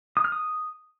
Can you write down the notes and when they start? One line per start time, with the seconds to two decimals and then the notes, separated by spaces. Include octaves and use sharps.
0.17 D#6
0.24 F6
0.32 D#6